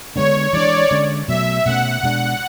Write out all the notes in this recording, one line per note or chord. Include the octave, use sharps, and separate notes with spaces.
D3 G#3 B3 D4 C#5
E3 G#3 D4 D5
D3 G#3 C#4
B2 F#3 A3 E5
B2 A3 C#4 F#5
B2 G#3 D4 F#5